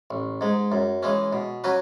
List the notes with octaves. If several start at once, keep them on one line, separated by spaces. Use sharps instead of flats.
A1
G#2 G#3
F#2
E3 G#3 C#4
B2
F#3 C#4 F#4 B4